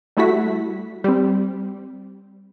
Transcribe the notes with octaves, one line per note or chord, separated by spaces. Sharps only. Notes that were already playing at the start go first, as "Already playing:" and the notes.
G3 A3 E4 F#4 B6
G3 C4